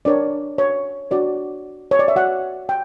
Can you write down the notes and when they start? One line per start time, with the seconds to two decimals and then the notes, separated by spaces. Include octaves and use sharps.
0.05 D4 A#4 C#5 D5
0.58 C#5
1.11 D4 F#4 C#5 D5
1.91 C#5
1.99 D5
2.08 E5
2.16 F#4 C#5 F#5
2.69 G5